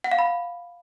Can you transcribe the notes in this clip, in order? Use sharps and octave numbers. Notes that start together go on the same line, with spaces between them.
F#5
F5
B5
F5